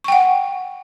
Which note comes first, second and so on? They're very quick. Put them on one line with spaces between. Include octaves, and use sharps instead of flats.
C#6 G5 F#5